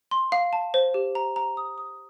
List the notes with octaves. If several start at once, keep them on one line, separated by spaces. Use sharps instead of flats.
C6
F5
A5
C5
G4
A#5
A#5
D#6
D#6